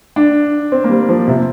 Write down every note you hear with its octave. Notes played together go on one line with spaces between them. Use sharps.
D4
C4
A#3
G3
F3
C3